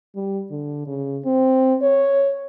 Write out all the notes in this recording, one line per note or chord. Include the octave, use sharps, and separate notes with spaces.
G3
D3
C#3
C4
C#5